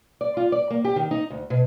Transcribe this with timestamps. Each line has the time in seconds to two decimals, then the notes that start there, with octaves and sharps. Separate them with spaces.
0.21 D5
0.37 F4
0.52 D5
0.70 A#3
0.85 G4
0.96 D#3
1.11 D#4
1.30 D2
1.50 B2